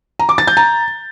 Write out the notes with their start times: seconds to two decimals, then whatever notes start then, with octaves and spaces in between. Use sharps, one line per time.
0.19 A#5
0.29 D6
0.38 A6
0.47 G6
0.57 A#5